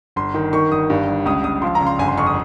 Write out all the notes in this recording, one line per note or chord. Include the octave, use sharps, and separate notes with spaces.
G1 C6
D#3
D#3 C#6
G1 D#6
G2
G1
C#2 D#6
C#2 D#6
F3 C6
A#5
C#3
C6
G1 G#5
C6
F2 C#6
D#6